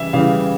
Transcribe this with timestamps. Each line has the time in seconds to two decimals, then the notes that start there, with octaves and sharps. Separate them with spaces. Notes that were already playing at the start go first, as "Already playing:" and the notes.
Already playing: C#3 E3 G3 E5
0.13 C#3 E3 G3 F5